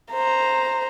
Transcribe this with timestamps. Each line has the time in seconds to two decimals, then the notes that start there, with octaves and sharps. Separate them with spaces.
0.13 C5 A#5